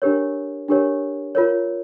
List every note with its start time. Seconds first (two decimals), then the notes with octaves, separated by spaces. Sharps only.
0.02 D4 G4 A#4 C#5
0.68 D4 G4 A#4 C#5
1.35 F4 A#4 C#5